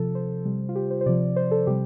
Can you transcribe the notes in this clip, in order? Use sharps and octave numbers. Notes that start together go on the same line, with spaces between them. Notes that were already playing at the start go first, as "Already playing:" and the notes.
Already playing: C3 F3 A4
C5
C3 G3
F4
G4
C5
C5
C3 F3 D5
C5
A4
C3 G3 G4